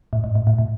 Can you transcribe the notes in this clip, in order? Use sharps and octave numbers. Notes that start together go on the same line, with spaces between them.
A2
G#2
A2
A2
A2